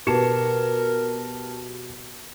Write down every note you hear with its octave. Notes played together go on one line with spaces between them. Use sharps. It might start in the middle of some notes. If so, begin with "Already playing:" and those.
B2 G4 A#4 A5 C#7 E7